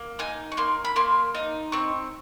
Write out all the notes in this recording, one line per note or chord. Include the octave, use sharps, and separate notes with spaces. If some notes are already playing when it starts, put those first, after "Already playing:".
Already playing: A#3
D#4 G#5
C#6
A#3 C6
B5
A#3 C6
D#4
C4 C#6